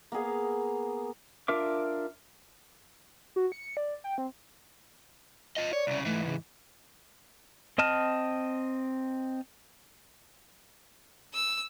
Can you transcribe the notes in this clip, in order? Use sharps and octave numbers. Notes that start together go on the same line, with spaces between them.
A#3 B3 G#4 F5
D4 F4 A#4 E5 D6
F#4
C#7
D5
G5
C4
F4 D#5
C#5 D5
C2 C#3
G#2 E3 A3
C#3
C4 D#5 A5 F6
E6